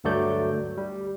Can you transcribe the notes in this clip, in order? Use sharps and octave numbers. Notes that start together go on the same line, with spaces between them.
D2 G2 F#3 A3 D5 G6
G3